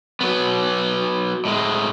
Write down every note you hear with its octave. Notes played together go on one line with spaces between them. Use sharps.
F#3 B3
A2 G#3